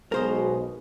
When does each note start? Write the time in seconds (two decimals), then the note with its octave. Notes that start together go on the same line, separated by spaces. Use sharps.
0.12 B1 B2 G#3 G#4 A#4 C5 D#5